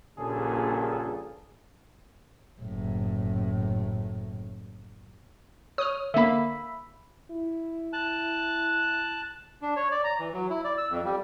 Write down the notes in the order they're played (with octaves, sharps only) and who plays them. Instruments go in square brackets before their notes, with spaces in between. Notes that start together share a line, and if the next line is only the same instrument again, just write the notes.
[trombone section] A#1 G2 A#2 C#3 G#4 A4
[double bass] F#1 A2
[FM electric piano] C#5 [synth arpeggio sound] D#6 F6
[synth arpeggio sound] D3 A#3 [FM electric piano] E5 B5
[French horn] E4
[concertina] A5 F#6
[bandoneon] D4
C#5
D5
A#5
E3
F#3
E4
D5
E6
F2
G3